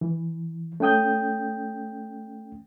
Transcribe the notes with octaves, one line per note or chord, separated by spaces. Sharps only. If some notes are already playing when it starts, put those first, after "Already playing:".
E3
A3 C#4 G5 D#6 G6